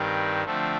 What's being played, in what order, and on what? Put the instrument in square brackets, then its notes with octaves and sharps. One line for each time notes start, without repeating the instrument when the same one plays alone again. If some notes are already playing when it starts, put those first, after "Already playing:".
Already playing: [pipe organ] G2 D#3 G3 C4
D3 F3 A3 C4